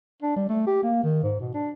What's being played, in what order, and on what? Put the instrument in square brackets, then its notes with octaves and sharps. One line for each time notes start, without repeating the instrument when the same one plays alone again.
[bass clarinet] D4
G3
A3
G4
A#3
D#3
G#2
B2
D4